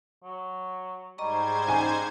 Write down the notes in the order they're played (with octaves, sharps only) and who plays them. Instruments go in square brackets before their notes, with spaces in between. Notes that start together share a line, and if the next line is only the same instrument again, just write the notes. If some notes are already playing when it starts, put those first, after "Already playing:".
[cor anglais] F#3
[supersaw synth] G#2 C5 G#6 [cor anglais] G3 [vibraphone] D#5 A#5 C#6
[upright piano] G#5